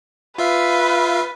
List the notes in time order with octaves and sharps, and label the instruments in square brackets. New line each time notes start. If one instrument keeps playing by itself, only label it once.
[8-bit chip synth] F4 E5 F5 [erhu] B4